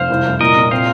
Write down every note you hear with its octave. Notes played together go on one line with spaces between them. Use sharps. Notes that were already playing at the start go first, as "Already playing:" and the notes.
Already playing: F1 C5 F5
C2
C2
A#2 A#4 D#5
A#2
C4 C5 F5